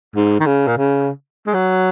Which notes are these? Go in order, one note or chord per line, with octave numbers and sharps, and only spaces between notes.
G#2
D#3
C#3
A#2
C#3
G#3
F#3